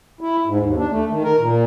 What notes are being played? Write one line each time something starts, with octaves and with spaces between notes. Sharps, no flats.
E4
G#2
D#2
D4
A3
D#3
A#4
A#2